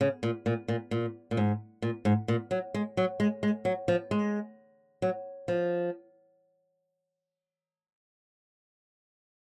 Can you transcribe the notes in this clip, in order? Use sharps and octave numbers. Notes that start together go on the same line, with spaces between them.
C#3
A#2
A#2
A#2
A#2
A#2
G#2
A#2
G#2
A#2
F#3
G#3
F#3
G#3
G#3
F#3
F3
G#3
F#3
F3